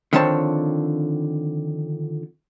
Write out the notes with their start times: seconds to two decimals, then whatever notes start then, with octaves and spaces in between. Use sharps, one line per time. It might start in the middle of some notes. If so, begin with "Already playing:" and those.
0.13 D3 D#3 F3 C4 C#5 A5